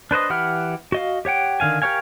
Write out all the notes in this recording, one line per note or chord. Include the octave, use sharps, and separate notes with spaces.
D4 B4 C5 D#5
E3 G4 F#5 B5 F6
F#4 D#5 F5
G4 C#5 F#5 G5
D3 D#3 F5 G#5
G4 A#4 C#5 F5 G#5